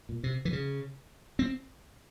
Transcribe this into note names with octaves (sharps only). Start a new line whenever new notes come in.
A#2
C3
E3
C#3
C4